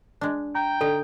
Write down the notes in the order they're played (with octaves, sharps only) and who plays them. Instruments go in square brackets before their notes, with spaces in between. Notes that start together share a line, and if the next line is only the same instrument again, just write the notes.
[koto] G#3 D4
[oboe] G5 [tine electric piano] A#5
[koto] D3 D#4 [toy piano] A4